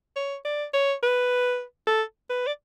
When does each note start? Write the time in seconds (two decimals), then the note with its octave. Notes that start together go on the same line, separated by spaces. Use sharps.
0.16 C#5
0.45 D5
0.74 C#5
1.03 B4
1.87 A4
2.30 B4
2.47 D5